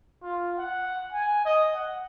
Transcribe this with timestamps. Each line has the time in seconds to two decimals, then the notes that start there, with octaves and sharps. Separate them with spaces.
0.23 F4
0.58 F#5
1.13 G#5
1.45 D#5
1.74 F#5